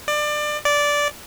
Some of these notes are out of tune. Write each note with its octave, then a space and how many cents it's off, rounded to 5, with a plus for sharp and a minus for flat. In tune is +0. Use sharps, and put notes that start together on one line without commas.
D5 +25
D5 -10